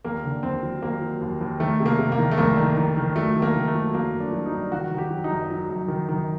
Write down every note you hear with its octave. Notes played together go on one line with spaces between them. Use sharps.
D#2 A#3
D3
D#2 C4
F#3
D#2 A#3
F#3
D#2
D#2
D#3 A3
C3
A#3
C3
A#3
D#3
A3
C2 A#3
D#3
D#3
D#3
F#3 A3
D#3
A#3
D#3
A3
F#3
F#3 A#3
G2
D4
F#3
D#4
G2
D#3 F#4
D#3
G4
F#3
D#4
F#2
F#3
F#2
D#3
D#3